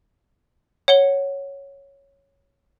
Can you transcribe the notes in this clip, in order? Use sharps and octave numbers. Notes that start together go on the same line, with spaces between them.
C#5 F#5 C#7 G7